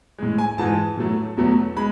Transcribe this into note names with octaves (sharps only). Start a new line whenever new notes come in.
A2 G#3
G#5
G#2 E3 G#3 A5
A2 F#3 A3
E2 B2 F#3 A3
G#3 B5